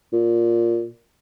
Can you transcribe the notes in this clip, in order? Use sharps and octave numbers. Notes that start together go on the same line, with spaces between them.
A#2